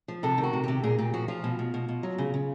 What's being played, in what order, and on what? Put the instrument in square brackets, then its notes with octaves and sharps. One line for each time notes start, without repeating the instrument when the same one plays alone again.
[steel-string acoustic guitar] F3
C3 A4
D#3
F#4
C3
C3 G4
A#2 G#4
A#2 G4
F3 F#4
F3 F4
B2
B2
B2
B2
F#3
C#3
C#3